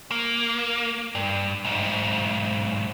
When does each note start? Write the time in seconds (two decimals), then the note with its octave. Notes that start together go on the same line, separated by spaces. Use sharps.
0.11 A#3
1.15 G2
1.65 B1 G#2